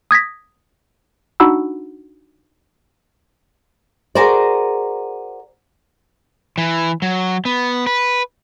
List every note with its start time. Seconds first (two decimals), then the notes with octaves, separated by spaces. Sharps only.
0.11 D#6 G#6 A#6 B6
1.40 D4 D#4 F#4 F#5 B5 E6
4.15 F#4 G#4 A#4 C5 D5
6.58 E3
7.02 F#3
7.45 B3
7.87 B4